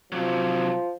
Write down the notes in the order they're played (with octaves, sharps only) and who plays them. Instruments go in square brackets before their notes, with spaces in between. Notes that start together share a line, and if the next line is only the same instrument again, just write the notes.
[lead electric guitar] C3 F#3 [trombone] F3